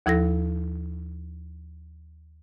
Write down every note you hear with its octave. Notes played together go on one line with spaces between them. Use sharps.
D#2 F3 E4 A4 A#6